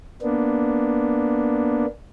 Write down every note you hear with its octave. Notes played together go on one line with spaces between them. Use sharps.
A#3 B3 D4